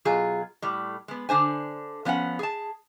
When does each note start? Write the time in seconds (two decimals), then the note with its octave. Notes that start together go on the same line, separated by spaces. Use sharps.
0.05 B2 F#3 F4 G#4
0.62 A2 G3
1.08 G#3 B3
1.29 D3 D4 C5 G#5
2.05 F3 B3 C#4 F5 F#5
2.39 G#4 A5